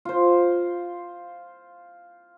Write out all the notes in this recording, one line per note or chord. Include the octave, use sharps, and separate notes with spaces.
F4 C5